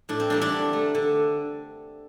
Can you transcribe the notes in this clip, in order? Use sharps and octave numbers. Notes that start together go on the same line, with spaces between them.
A2 D4
C4
E3 G3 A#3 D4
D4
D3
A3
D3